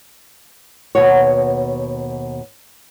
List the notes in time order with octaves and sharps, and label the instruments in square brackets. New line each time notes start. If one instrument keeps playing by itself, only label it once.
[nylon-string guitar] D#2 B2 B3 F#4 C#5